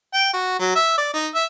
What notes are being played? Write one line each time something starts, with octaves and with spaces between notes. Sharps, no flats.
G5
F#4
F#3
E5
D5
D#4
E5